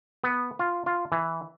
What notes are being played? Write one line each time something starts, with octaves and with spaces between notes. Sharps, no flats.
B3
F4
F4
E3